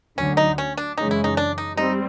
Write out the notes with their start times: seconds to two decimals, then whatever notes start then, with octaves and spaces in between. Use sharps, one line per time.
0.18 D2 D3 F#3 C#4
0.37 D#4
0.58 C#4
0.77 D4
0.97 F#2 C#3 E3 G#3 C#4 D#4
1.11 E4
1.24 D#4
1.37 D4
1.58 D#4
1.77 G3 C4 D#4